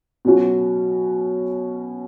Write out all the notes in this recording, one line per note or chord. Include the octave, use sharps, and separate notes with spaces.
B2 F#3 C#4 F#4